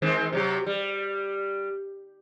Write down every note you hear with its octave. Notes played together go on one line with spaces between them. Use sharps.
D#3 G#3 C4
C3 F#3 G4
G3